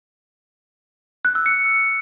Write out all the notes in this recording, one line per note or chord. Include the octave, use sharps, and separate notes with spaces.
F#6
E6
C#7